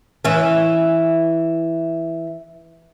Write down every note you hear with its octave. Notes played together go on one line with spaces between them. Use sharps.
E3 C#4